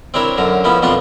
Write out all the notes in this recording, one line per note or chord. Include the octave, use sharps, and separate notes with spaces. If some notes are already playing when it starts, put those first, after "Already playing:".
C4 D4 E4 A#4 C#5
F#2 D3 A#5
D#3 F3 B3 C#4 E4
F2 B2 D4 F4 F#5 C6